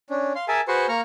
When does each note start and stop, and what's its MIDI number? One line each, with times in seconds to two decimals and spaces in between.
0.10 0.33 61
0.10 0.33 62
0.35 0.45 77
0.35 0.45 84
0.48 0.61 68
0.48 0.61 70
0.48 0.61 76
0.48 0.61 80
0.48 0.61 81
0.68 0.87 66
0.68 0.87 68
0.68 0.87 71
0.68 0.87 72
0.68 0.87 84
0.68 0.87 85
0.89 1.01 58
0.89 1.01 82
0.89 1.01 85
0.89 1.01 89